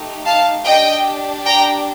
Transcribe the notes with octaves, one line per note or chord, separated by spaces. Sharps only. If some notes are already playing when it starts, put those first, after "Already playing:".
Already playing: A3 D#4 G4
F5 A5
D4 G4 D#5 G5
G5 A#5